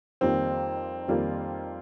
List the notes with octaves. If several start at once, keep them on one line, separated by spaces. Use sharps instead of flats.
F2 D#3 G3 A#3 C4 F4
F2 D#3 G3 A#3 F4